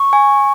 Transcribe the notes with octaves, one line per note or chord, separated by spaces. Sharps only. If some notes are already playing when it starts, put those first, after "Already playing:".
Already playing: C#6
G#5